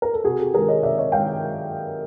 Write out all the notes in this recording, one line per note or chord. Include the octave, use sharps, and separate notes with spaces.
A#4
A4
C3 F#4 G#4
G4 A4
D#3 G#3 G#4 A#4
C#5 D#5
C3 D5 E5
C#5 D#5
D#3 G#3 F5 G5